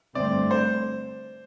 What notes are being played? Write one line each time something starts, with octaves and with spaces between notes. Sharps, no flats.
G2 D3 A3 C4 D5
C5